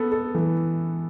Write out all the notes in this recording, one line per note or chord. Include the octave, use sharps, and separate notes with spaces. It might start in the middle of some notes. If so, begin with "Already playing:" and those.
Already playing: B3 A4
A4
E3